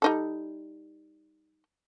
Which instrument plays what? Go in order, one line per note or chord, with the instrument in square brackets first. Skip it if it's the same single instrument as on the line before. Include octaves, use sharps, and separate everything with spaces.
[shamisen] G3 D#4 A4